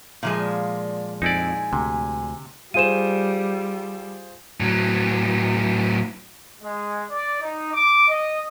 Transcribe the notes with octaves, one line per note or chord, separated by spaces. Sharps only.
A#2 F3 G#3
D5
F2 D#4 E4 D5 G#5
D2 C3
G3 F4 G#4 C5 D#7 E7
A2 F#3
G#3
D5
D#4
D6
D#5